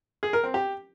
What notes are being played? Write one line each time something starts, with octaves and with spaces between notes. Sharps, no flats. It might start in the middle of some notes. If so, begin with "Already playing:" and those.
G#4
A#4
C4
G4